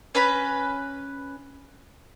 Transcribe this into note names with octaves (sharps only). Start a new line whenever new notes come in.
C#4 B4 A#5 B5